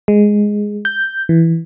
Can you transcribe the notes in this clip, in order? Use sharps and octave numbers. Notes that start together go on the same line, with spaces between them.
G#3
G6
E3